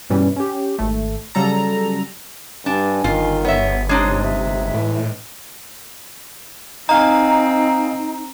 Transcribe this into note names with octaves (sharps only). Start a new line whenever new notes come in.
G2 B2 E3 G3 C#4
C#4 G4
G#1 A3
C#3 F#3 G3 A4 A#5
G2 D4 G#5
G1 D#3 F4
B3 C#5 E5
C3 G#3 D4 D#4 C#5
E5
A2 E3
C4 D#4 D#5 F5 G#5 A#5